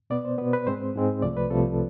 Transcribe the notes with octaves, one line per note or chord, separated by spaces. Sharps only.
B2 B3 D5
C5
B2 B3 B4
B4
G#2 G#3 C4 C5
G#2 G#3 C4
C2 C3 F3 A3 D5
B4
C2 C3 F3 A3 A4